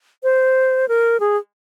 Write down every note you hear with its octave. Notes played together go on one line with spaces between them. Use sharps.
C5
A#4
G#4